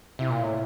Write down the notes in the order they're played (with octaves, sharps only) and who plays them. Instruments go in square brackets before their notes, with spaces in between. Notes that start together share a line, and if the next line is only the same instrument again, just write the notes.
[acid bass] C3 [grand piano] E4
[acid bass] A#2
A2